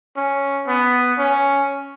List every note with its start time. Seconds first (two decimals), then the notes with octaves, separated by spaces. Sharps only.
0.17 C#4
0.67 B3
1.17 C#4